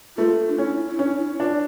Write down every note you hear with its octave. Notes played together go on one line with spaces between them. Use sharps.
A3 F4
D4
C#4 E4
E4
C#4 D4
E4
D4 F4